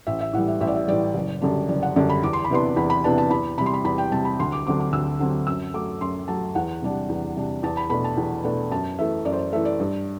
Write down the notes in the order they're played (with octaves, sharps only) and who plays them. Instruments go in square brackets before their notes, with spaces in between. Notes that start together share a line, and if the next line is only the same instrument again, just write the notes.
[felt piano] A1 E5
E5
A2 E3 G3 F#5
E5
A1 E5
D5
E5
A2 E3 G3 D5
F#1
F#2 D3 G3 D4
F#1 D5
F#5
F#2 D3 G3 D4 D5
B5
E2 D6
C6
B5
C3 E3 B3 D4 C6
E2 B5
B5
C3 E3 B3 D4 A5
A5
E2 B5
C3 G3 B5
C6
B5
E2 B5
G5
C3 G3 A5
B5
D2 C6
D6
D3 F#3 C4 D6
D6
D2 E6
D3 F#3 C4
F#2 E6
F#3 A3 D6
F#2 C6
F#3 A3 A5
E2 F#5
C3 G3 D4
E2
C3 G3 D4
E2 A5
B5
B2 A3 D4 B5
A5
E2
B2 A3 D4
F#2 A5
E3 A3 E5
F#2 D5
C5
D5
E3 A3 E5
D5
G2